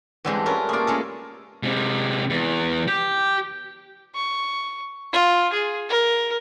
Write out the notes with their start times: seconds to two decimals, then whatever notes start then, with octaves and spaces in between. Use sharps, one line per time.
0.25 G2 D3 E3 G3 G#3 C4
0.46 C#4 F4 A#4 B4
0.69 A3 A#3 F4 G#4 D5
0.87 G#3 C#4 A4
1.63 C3 G#3
2.30 E2
2.88 G4
4.15 C#6
5.13 F4
5.53 G#4
5.89 A#4